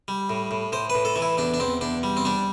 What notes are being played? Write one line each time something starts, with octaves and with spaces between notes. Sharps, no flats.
G3
A2
A2
A2 C5
A2 B4
A4
E3
E4
E2 D4
D4
E2 C4
E2 D4
G3
C4
G3 D4